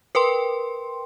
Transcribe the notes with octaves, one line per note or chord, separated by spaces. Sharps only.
A#4 B4 G5 C6